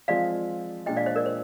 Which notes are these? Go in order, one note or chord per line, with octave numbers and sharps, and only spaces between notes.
F3 G#3 C4 F4 D5 F5
A#2 G#3 D4 F4 D#5 G5
D5 F5
C5 D#5
A#4 D5
C5